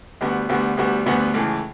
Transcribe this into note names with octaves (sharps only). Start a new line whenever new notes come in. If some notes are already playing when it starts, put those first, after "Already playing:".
D2 D3 G3 B3 F#4
D2 D3 G3 B3 F#4
D2 D3 G3 B3 F#4
D2 D3 G3 B3 F#4
C#2 C#3 E3 A3